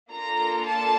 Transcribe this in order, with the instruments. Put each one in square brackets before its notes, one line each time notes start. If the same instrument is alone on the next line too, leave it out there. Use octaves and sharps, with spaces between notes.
[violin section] A#3 D4 F4 A4 A#5
A5